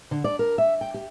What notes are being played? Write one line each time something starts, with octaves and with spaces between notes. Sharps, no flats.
D3
D5
A#4
E5
G5
G4